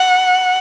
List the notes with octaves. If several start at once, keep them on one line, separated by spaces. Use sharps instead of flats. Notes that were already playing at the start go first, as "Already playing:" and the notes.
Already playing: F#5